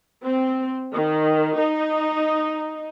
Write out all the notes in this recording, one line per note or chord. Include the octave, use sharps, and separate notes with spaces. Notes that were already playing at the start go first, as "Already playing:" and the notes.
C4
D#3
D#4